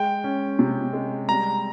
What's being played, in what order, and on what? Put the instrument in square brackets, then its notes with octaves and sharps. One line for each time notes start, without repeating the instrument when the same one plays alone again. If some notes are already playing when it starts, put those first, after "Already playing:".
Already playing: [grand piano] G#3 [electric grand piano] G5
[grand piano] C#4
C3
G#3
[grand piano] G3 [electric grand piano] A#5